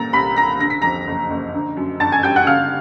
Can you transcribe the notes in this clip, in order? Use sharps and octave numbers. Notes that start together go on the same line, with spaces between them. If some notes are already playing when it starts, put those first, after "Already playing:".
Already playing: A#2 G3 A#5 A6 A#6
C2 B5 B6
C2 A#5 A#6
D3 A#6
B6
F2 A#5 A#6
F#1
F#1
D3
F#2
G1 A5 A6
G#5 G#6
G3 G5 G6
F#5 F#6
C#3 F5 F6